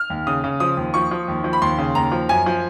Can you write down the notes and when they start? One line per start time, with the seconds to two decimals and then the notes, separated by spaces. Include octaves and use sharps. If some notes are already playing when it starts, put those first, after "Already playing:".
Already playing: F6
0.10 D#2
0.27 C#3 D#6
0.44 C#3
0.60 F3 D#6
0.77 D#2
0.94 F3 C#6
1.11 F3
1.28 D#2
1.44 F3
1.53 B5
1.62 D#2 C6
1.78 C#3
1.95 D#2 A#5
2.12 F3
2.29 F#2 G#5
2.46 F3